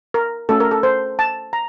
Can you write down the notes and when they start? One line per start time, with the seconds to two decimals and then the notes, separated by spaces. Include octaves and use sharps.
0.14 A#4
0.49 A3 C#4 F#4 A4
0.60 A#4
0.71 A4
0.83 C5
1.19 A5
1.53 A#5